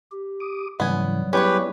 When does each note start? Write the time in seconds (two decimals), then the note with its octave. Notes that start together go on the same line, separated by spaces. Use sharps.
0.11 G4
0.40 D6 D#6
0.80 G#2 C#3 E3 F#3 G3 B3 G#5
1.33 B3 C#4 E4 G4 G#4 B4 C#5